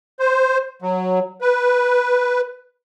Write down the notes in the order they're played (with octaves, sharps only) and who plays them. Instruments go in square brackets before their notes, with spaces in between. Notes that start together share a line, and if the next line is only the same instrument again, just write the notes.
[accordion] C5
F#3
B4